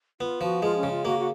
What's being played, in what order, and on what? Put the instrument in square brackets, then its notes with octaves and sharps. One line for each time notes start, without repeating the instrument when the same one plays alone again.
[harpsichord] B3 [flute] F4
[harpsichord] F3 [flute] F#4
[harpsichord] G#3 [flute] F4
[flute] C#4
[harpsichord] C#3
[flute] F4
[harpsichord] A#3 [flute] F#4
[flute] F#4